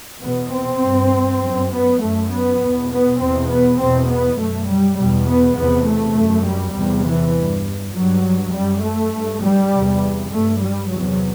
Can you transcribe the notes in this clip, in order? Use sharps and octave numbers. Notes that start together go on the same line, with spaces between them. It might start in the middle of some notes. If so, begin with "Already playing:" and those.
E2 B2 B3
C4
G2
F#2
B3
F#2 A3
B3
E2 B2
B3
E2 B2 C4
B3
E2 B2 C4
B3
F#2 A3
G3
E2 B2 G3
B3
E2 C3 B3
A3
F#2
G3
E2 C3
E3
G2
G2 F#3
F#2 G3
A3
G2
G3
E2 C3
G2 A3
G3
E2 C3 F#3